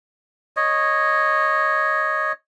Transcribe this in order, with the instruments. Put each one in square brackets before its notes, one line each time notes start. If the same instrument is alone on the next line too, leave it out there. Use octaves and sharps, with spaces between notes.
[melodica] C#5 D#5